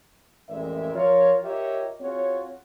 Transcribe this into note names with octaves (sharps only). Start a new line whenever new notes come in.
A1 F2 G#3 A#4 D5 E5
F3 F4 A#4 C#5
F4 G4 A#4 C#5 D#5 E5
C4 F4 F#4 G#4 C#5